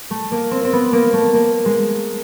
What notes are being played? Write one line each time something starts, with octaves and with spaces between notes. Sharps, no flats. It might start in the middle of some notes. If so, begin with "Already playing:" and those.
A3
A#3
C4
C4
B3
A#3
A3
A#3
G#3